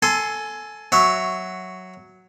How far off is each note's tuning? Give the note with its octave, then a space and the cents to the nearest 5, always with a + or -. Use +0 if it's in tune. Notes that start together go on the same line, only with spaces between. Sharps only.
A4 +0 G#5 +15 C6 -5
F#3 +0 E5 +0 C#6 +0